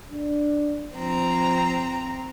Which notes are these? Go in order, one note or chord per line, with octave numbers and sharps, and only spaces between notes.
D4
F3 C4 A#5